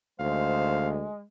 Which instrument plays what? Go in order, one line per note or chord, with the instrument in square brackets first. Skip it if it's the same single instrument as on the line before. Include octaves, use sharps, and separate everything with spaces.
[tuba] D2 [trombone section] C3 D#3 C5 [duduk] G#3 [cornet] F5